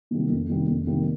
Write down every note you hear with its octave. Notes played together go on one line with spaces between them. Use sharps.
C3 D#3 G3 A#3
F2
C3 D#3 G3 A#3
F2
C3 D#3 G3 A#3